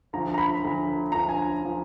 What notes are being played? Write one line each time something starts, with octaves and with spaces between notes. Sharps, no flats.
D2 D3 F3 A#5
A#5
B5
D2 D3 F3
D2 D3 F3 A#5
G#5
D3 F3